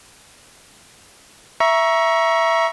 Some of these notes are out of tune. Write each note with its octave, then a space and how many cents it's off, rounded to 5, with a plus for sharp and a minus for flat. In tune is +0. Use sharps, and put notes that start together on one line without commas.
E5 +5 A#5 +25 C#6 +0